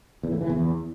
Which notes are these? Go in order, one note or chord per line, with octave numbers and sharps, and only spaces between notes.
E2
A2
E3
E2